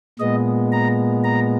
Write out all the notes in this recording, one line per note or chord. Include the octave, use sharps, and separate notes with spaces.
A#2 G#3 B3 D#5
A#5
A#5